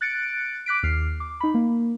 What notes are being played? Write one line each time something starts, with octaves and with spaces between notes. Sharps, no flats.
F#6 A6 C#7 D7
D6 F#6 B6 D7
D#2 F6 C7
D6
D#4 B5
A#3